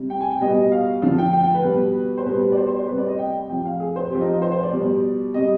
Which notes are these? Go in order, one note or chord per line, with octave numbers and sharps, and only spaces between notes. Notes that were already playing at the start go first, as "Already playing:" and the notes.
Already playing: C3 G3
G5
G#5
G5
B2 G3 D#5
F5
D3 F3
G5
G5
G5
B4
B2 G3
C5
B2 G3 B4
D5
C5
C5
D5
C3 G3 B4
D5
D#5
G5
C3 F3 G5
F5
G#4
C5
C3 F3 G4
D#4
F4
C5
C5
D5
B2 G3
C3 G3 D#5